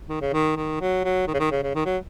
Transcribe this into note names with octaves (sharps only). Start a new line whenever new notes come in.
D#3
C#3
D#3
D#3
F#3
F#3
D#3
C#3
D#3
C#3
C#3
D#3
F#3